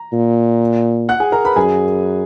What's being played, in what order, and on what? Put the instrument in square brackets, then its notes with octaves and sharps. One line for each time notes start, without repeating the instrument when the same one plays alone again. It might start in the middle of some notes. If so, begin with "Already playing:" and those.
Already playing: [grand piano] A#5
[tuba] A#2
[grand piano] F#5 F#6
G#4 G#5
A#4 A#5
B4 B5
[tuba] F#2 [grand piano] G#4 G#5